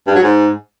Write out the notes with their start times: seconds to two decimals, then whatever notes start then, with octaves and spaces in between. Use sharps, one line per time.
0.07 G2
0.15 F#3
0.23 G#2